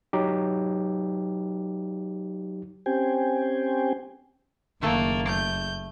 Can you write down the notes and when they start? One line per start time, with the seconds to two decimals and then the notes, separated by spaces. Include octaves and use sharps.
0.13 F#3 D#4 G4
2.86 C4 C#4 G4 C5 G5 G#5
4.82 F#1 D#3 A3 A#3 A4
5.29 A3 G6